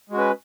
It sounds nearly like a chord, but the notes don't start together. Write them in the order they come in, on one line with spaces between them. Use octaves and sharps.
G#3 F#4 C#4 B4